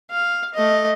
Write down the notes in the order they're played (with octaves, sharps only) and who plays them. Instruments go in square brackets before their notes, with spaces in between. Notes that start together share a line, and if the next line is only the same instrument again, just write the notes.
[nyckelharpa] F5
A3 D#5